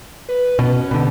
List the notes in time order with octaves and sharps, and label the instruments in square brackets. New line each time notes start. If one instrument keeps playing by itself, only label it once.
[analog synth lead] B4
[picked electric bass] B2 [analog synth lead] C#4
[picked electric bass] B2 D3 [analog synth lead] G3